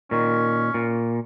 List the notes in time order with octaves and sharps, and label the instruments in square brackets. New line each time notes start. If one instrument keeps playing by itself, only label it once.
[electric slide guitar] A#2 D#3 [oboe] C#4
[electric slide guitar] A#2